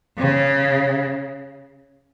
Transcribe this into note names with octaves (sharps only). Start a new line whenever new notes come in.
C#3